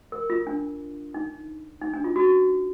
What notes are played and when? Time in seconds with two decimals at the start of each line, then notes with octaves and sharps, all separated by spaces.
0.12 A#4
0.30 F4
0.47 D4
1.14 D#4
1.82 D#4
1.93 D4
2.04 F4
2.16 F#4